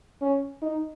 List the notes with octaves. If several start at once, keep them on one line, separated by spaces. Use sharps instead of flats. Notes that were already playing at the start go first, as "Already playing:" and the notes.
C#4
D#4